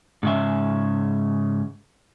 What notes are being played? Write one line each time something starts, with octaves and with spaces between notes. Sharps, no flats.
G#2 C#3 E5